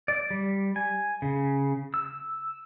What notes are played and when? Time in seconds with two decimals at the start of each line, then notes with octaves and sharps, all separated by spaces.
0.08 D5
0.30 G3
0.76 G#5
1.22 C#3
1.94 E6